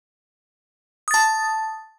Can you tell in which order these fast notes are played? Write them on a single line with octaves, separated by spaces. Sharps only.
D#6 A6 A5